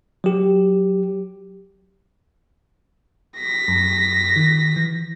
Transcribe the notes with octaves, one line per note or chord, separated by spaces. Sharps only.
F#3 G4
A#6 B6
F#2
D#3
E3